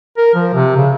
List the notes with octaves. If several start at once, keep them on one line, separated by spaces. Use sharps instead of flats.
A#4
F3
C3
C#3